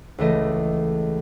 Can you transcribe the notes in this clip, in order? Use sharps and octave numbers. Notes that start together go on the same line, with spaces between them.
C#2 E3 A3 D#5